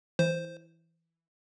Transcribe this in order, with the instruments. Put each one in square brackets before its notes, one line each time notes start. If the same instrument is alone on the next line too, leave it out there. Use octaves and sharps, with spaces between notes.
[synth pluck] E3 [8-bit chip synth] C5